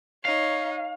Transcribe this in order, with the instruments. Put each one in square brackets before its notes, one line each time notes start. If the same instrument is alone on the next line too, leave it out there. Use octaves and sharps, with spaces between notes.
[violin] D#4 [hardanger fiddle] C#5 [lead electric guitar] F5